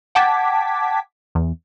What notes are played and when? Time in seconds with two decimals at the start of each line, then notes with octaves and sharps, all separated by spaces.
0.15 F#5 G5 A5 D6 G#6 B6
1.35 E2